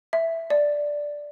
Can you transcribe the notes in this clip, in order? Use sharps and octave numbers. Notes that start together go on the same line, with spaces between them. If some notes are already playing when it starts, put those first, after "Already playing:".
E5
D5